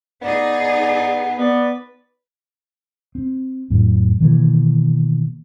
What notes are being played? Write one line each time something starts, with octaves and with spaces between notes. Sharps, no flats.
B3 D#4 G#4 D5
B3 B4 D5
C4
F2 A2 F#3
B2 D#3 E3 A#3